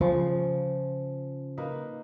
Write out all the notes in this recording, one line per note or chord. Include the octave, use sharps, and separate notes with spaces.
C#3 F3
A#3 D#4 B4